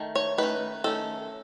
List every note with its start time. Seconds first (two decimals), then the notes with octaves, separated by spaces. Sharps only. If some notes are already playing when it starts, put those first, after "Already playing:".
Already playing: D#3 A3
0.15 C#5
0.38 D#3 A3 C#4 B4
0.84 D#3 A3 C#4 A4